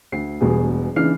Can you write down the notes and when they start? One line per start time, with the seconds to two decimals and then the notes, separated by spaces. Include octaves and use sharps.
0.12 D2 C7
0.40 E1 E2 B2 G3 G#4
0.96 C#3 E3 D4 D#4 F6 C7